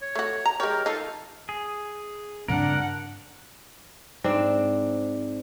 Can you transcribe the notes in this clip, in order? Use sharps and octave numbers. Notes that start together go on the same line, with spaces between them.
C#5
A3 F#4
A#5
G#3 G4 A#4 C#5
D#4 F4 A4 F5
G#4
G2 C#3 C4 D4 A#4 F#5
G#2 C4 D4